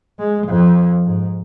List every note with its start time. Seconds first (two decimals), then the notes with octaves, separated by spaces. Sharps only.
0.19 G#3
0.47 F2
1.04 G#2